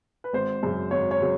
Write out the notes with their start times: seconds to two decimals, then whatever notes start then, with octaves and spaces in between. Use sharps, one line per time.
0.24 B4
0.33 G#1 C5
0.63 F#2 C#3 F#3
0.91 G#1 C#5
1.11 C#5
1.21 C#3 F#3